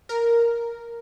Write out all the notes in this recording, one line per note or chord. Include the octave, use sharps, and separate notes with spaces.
A#4